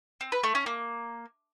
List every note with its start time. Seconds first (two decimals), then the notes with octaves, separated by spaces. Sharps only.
0.21 C4
0.32 B4
0.43 A3
0.55 C#4
0.66 A#3